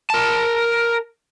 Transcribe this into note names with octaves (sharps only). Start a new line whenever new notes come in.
A#4 A5